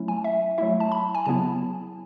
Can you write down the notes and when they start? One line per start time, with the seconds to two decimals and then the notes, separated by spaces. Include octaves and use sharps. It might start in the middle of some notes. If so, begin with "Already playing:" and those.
Already playing: F#3 A3 C#4 E4
0.08 G#5
0.24 E5
0.58 F#3 A3 E4 E5
0.80 A5
0.92 B5
1.15 G#5
1.26 C#3 F#3 B3 E4 A5